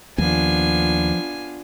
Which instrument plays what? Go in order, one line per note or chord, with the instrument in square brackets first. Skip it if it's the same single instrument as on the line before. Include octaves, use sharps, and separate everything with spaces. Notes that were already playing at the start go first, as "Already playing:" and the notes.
[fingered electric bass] D#2 [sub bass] F3 [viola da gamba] B3 D4 F4 [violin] G#5